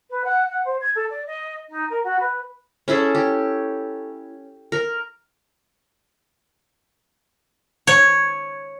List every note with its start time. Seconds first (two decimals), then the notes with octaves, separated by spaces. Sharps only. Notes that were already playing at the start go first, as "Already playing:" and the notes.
0.09 B4
0.24 F#5
0.49 F#5
0.64 C5
0.80 G#6
0.95 A4
1.09 D5
1.26 D#5
1.69 D#4
1.89 A#4
2.03 F#4
2.19 B4
2.88 C#4 E4 G#4 A4
3.15 G4
4.72 A#4
7.87 C#5